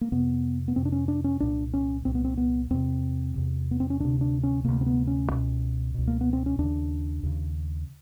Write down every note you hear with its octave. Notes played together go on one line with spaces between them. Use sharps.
A#3
F2 C3 B3
B3
F2 C3 C4
D4
C#4
D4
C#4
C2 A#2 D4
C#4
C2 A#2 C4
B3
C4
B3
E2 C3 C4
E2 C3
B3
C4
C#4
D2 C3 D4
D4
C#4
D2 C3 A#3
C4
B3
C#4
C#2 B2
C#2 B2
A#3
B3
C4
C#4
D#2 C#3 D4
D#2 C#3